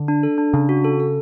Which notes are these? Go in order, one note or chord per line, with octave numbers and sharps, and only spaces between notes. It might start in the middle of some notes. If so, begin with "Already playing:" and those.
Already playing: D3
D4
A4
D4
C#3 D4
F#4
A4
A4